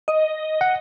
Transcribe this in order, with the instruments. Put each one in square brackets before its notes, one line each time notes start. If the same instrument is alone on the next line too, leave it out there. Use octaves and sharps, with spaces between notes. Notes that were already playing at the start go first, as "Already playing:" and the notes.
[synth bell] D#5
[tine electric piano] F#5